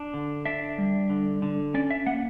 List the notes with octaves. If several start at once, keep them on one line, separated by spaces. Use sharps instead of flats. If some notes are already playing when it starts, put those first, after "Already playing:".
Already playing: D4
D3
D4 E5
G3
D3
D3
C#4 D5
E5
A#3 F#5